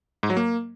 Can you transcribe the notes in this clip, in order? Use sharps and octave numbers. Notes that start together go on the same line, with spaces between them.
G#2
F#3
A#3